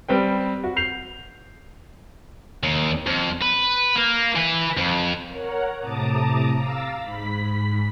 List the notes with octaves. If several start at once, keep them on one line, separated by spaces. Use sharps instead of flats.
G3 C4 B4 G5
F#4
G6 C7 F7
D#2
F2
B4
A#3
E3 B4
F2
A#4 C#5 F#5 A#5
A2 C3 A5 A#5 D6 D#6
F5 A#5 D6 E6 A6
G#2 B5 B6